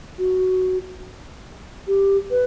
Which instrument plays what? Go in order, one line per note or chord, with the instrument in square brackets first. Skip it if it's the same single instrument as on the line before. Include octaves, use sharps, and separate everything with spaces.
[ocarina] F#4
G4
B4